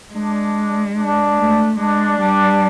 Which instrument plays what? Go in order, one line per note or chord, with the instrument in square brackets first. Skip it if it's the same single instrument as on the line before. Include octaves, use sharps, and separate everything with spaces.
[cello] G#3 [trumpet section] D4
[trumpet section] D4
[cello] A3
[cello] G#3 [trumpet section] D4
[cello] G3